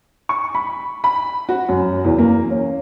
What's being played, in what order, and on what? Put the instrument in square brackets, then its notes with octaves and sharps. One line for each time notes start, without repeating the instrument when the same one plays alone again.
[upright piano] C#6
B5
B5
F#4
F#2
E2
A#3
C#4